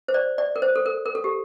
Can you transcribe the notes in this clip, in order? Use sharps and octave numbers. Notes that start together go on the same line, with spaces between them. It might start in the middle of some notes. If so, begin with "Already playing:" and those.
C5
D5
D5
A#4
C5
A4
A#4
A#4
A4
G4